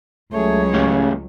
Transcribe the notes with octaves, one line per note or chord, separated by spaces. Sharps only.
C#2 F#3 A3 G#4 C#5
C#3 A3 C#4 G4